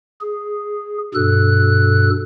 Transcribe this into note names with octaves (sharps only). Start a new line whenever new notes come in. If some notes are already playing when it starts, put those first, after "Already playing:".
G#4
G2 B2 A4 F#6